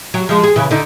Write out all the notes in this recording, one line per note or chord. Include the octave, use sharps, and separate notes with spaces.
F#3
F3 G#3
G#4
C#3 E3
D3 D#4